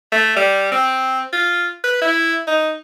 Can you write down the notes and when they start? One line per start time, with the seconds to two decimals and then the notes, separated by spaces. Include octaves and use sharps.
0.12 A3
0.37 G3
0.72 C4
1.33 F4
1.84 B4
2.02 E4
2.47 D#4